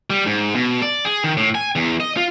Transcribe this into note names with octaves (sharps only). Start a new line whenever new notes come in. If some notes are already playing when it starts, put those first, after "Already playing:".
G3
G#2
B2
D5
G#4
D#3
A2
G#5
E2
D#5
F4